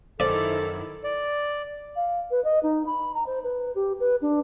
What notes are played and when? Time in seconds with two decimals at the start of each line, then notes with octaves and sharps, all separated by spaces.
0.20 F#2 D#3 E4 A4 C5 D5
1.04 D5
1.96 F5
2.31 B4
2.44 D#5
2.63 D#4
2.86 B5
3.15 A#5
3.27 C5
3.44 B4
3.75 G4
4.00 B4
4.22 D4